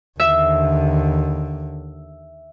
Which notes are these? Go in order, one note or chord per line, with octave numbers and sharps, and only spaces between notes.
D#2 D3 E5